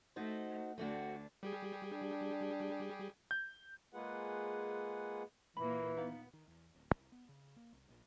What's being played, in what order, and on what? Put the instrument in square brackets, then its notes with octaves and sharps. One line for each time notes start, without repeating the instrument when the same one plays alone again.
[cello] A3 [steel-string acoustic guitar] D#4 F#4 C5
[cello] D2 D4 [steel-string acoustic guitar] A3 C4 F#4
[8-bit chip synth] G3 G4 G#4
[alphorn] D4
[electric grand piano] G6
[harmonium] G#3 A#3 F4 G#4 B4 F#5
[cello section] D#2 A#2 A#3 [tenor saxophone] E3 [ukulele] B5
[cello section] B3 [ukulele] D#4 F5
[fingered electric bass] D#3
E2
D1
C2
B3
C#3
A#3
C2
A#1